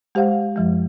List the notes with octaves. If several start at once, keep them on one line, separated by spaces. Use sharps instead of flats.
G#3 G4 C5 F5 F#5
F#2 F3 G#3